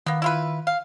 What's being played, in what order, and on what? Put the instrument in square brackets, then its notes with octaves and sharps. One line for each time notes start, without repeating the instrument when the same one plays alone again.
[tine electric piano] D#3 [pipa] A#3 B3
[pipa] E4 F4 B4
F5